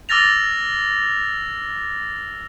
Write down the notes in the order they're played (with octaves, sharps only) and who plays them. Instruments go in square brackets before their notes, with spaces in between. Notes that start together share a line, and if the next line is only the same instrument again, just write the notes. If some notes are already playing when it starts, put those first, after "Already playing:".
[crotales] D6 E6 F6 A6 A#6 F7